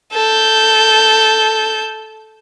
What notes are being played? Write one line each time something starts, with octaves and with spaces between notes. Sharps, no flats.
A4 G6